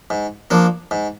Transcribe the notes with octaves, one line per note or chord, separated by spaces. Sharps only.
G#2
F3 A#3 D4
G#2